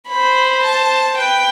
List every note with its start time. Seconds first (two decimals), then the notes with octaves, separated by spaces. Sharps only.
0.08 C5 B5
0.63 A5
1.18 B4 G5